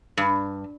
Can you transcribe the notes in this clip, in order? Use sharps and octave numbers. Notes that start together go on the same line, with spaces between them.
G2